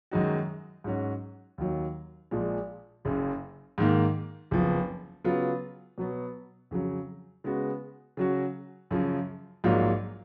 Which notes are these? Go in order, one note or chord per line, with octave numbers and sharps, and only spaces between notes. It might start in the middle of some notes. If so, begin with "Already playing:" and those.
F#2 D#3 G#3 D#4 F#4
G#2 F#3 C#4 F#4
D#2 D#3 F#3
A#1 A#2 F3 G#3
F#1 F#2 C#3
G#2 D#3 A#3
F#1 F2 F3 B3
C#3 F#3 B3 F4
B2 F#3 B3
F2 C#3 F#3
C#3 G#3 B3 F#4
C#3 F#3 C#4 F#4
F#2 C#3 F3
A#1 G#2 F#3 A#3 F4